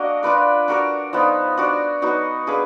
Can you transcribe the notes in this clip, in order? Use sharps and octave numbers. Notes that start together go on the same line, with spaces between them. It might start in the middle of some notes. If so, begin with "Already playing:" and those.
Already playing: A#3 D4 F#4 A#4 D#5
D4 F4 B4 D5
D4 F#4 A#4 D5
F3 B3 D#4
D4 F#4 D5
F#3 B3 D#4 F#4
D4 G#4 B4 F5